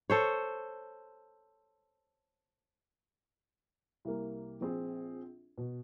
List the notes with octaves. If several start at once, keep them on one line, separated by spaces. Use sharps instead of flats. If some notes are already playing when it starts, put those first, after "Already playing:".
A4 C5 C#5
C2 A#3
A#1 C4 G#4
B2